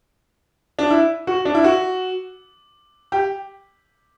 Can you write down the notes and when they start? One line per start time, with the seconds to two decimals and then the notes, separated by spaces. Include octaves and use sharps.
0.79 D4
0.90 E4
1.27 F#4
1.45 D4
1.55 E4
1.64 F#4
3.12 G4